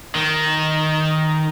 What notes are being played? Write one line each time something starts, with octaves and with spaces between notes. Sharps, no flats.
D#3